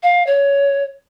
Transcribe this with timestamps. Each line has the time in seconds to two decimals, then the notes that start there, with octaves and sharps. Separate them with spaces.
0.03 F5
0.27 C#5